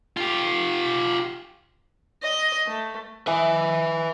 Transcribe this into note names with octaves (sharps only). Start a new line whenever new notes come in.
F4 G4
D#5
A3
E4 B4 D#5 E5 G#5